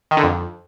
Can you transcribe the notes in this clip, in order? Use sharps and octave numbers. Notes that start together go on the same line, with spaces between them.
D#3
D3
F2